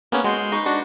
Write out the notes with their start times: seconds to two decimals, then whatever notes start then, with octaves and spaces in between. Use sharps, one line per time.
0.12 A#3 B3 C#4 G#4 C#5
0.24 G#3 F#4 C6 G6 C7
0.52 D#4 B4 C#6
0.66 D4 F#4